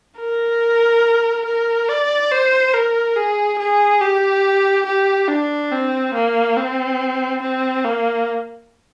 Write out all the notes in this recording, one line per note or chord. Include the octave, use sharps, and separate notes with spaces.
A#4
A#4
D5
C5
A#4
G#4
G#4
G4
G4
D4
C4
A#3
C4
C4
A#3